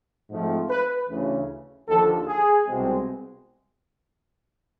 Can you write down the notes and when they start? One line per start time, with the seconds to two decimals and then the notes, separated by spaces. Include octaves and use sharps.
0.30 G#2 F3 A3 C4
0.70 B4
1.09 D2 C#3 E3
1.87 D#2 D3 F3 A4
2.27 G#4
2.66 C2 B2 G#3 C4